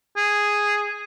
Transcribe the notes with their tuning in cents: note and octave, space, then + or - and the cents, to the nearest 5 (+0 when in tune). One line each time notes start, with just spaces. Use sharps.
G#4 -5